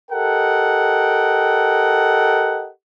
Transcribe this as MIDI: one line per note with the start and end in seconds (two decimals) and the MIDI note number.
0.12 2.70 67
0.12 2.70 69
0.12 2.70 70
0.12 2.70 75
0.12 2.70 78
0.12 2.70 79